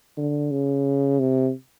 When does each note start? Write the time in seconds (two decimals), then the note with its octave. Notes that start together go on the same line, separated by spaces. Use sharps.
0.17 D3
0.51 C#3
1.20 C3